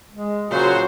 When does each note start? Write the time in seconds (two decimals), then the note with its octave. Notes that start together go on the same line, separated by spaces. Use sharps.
0.12 G#3
0.50 A#2 C#3 F#3 F#4 C5 C#5